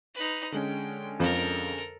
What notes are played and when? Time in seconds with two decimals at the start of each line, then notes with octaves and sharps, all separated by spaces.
0.15 D#4 B4
0.52 D3 G#3 C#4 G5
1.20 F2 A4 A#4